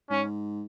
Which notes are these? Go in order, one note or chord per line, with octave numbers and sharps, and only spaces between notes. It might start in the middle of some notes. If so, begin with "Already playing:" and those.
G#2 C#4